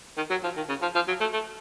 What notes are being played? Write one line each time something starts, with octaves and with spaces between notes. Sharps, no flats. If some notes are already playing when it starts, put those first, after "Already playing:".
D#3
F#3
F3
D#3
C#3
F3
F3
F#3
A3
A3